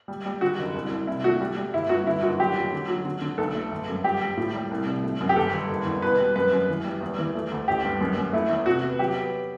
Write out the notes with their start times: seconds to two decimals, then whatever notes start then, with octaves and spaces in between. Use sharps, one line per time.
0.08 G3
0.26 G3
0.41 D3 F#4
0.59 F#1
0.75 C2
0.91 C2
1.07 C3 E4
1.24 A3 F#4
1.41 G3
1.57 G3
1.74 G1 E4
1.89 G2 F#4
2.07 D3 E4
2.22 F#1 F#4
2.39 F#3 G4
2.57 F#3
2.72 D3
2.88 F#3
3.05 D3
3.21 D3
3.38 B1 A4
3.55 A3
3.72 G1
3.89 F#2
4.04 G3 G4
4.22 G3
4.37 A2
4.54 G3
4.71 C2
4.87 C3
5.04 A3
5.21 F#2
5.29 G4
5.36 G1 A4
5.52 G1
5.69 F#1
5.85 E2
6.02 B2 B4
6.19 G3
6.36 F#2 B4
6.53 F#2
6.69 E3
6.84 G3
7.01 E2
7.18 E3
7.35 A3
7.51 D2
7.68 A1 G4
7.85 G2
8.01 F#2
8.18 F#2
8.33 A3 E4
8.49 E2
8.66 C3 F#4
8.82 B3
8.99 F#3 G4
9.16 B3